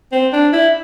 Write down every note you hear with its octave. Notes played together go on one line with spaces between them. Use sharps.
C4
D4
E4